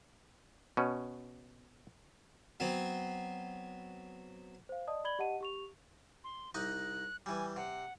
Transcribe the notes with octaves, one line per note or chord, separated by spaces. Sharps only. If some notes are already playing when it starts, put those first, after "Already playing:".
B2 C#4
F#3 B3 C4
C5 F5
D5 D#5 A5 D#6
D5 B5 G#6 F#7 G7
G4 D#5 F#5 A5 D#7
G4 C#6 F7
C6
C2 D#4 D#5 F#6
E3 G3 G#5
C3 F#5